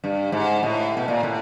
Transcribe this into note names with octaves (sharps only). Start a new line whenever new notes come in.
G2
G#2
A2
B2
A#2
A2